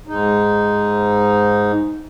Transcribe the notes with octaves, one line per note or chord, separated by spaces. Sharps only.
G#2 D#4